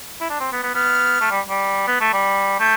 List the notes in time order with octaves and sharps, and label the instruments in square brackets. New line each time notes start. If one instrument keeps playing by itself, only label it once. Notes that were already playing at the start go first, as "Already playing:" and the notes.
[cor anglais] E4
D4
C4
B3
B3
[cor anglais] B3 [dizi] F6
[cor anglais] A3
G3
G3
B3
A3
G3
[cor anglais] A3 [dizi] G6